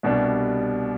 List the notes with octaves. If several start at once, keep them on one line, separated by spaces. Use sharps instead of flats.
C2 B2 G3 D4